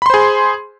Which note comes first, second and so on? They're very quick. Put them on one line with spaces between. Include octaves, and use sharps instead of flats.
B5 C6 C5 G#4